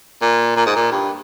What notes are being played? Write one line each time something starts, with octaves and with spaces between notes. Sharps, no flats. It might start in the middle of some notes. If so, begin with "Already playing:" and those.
A#2
A#2
G#2
A#2
G2